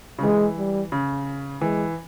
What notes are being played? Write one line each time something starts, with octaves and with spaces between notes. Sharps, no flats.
C#3
E3 G#3
G3
C#3
E3 G#3